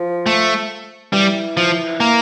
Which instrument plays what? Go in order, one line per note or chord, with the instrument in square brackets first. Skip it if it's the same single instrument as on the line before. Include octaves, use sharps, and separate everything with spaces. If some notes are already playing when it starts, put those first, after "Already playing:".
Already playing: [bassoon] F3
[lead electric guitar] A3
[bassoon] E3 [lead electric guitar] G3
[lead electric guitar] F3
A#3